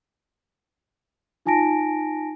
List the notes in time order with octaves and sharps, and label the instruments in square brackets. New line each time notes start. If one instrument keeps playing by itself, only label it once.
[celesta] D#4 F4 G#5 A5 A#6 D7